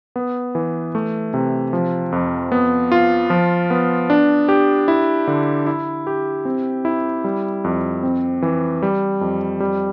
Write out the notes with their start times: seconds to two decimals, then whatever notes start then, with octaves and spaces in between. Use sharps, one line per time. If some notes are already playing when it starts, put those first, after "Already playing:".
0.16 B3
0.55 E3
0.95 A3
1.34 C3
1.73 F3
2.12 F2
2.52 B3
2.92 F4
3.30 F3
3.70 B3
4.10 D4
4.48 G4
4.88 E4
5.27 D3
5.66 E4
6.07 G4
6.45 C4
6.85 E4
7.24 G3
7.64 F2
8.03 C4
8.42 E3
8.82 G3
9.21 F2
9.60 G3